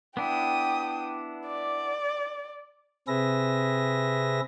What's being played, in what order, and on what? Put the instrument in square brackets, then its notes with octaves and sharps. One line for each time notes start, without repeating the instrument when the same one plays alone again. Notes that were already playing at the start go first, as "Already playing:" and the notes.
[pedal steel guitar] B3 D4 E4 [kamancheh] G5 D#6
[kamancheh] D5
[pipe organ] C3 C4 G#4 B4 E5 A#6